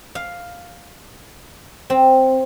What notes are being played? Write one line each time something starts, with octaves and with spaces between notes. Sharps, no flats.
F5
C4